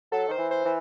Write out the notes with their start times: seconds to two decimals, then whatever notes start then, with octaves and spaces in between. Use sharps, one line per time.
0.12 F#3 A4
0.28 D#3 C5
0.38 E3
0.51 C5
0.65 E3